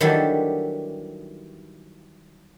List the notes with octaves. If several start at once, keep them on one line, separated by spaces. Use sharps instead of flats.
D#3 E3 F#3 G3 D4 A4